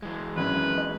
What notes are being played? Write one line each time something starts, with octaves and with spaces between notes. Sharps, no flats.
E3 G#3
G#1 F#2 B4
D#5